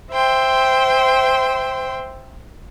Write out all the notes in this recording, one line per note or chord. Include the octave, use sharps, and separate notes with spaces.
C5 E5 G5 C6